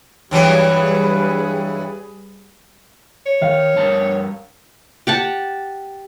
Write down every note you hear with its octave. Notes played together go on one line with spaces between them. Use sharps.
G2 E3 F#3 G3 G#4 B4
C#5
D#3 F5
G2 A#4 A5
G4 F#5 A5